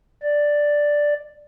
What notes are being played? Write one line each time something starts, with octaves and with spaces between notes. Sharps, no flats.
D5